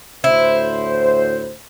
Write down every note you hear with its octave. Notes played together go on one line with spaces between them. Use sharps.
D2 A2 E4 C5